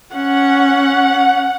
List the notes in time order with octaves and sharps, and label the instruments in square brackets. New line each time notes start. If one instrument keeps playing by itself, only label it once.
[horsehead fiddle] C#4 [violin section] F#5